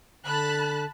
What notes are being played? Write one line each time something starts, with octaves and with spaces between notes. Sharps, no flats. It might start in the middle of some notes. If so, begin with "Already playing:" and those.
D3 A5 B5 F#6